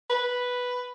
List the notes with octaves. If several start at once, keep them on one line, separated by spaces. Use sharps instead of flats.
B4